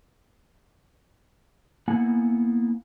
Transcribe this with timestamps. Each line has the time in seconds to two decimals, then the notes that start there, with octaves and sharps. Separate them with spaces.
1.88 A#3 B3 E4 F#5 G#5